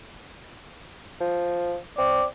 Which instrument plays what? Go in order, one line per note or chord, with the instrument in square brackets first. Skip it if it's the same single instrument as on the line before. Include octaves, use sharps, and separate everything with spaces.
[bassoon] F3
[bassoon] C4 [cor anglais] D5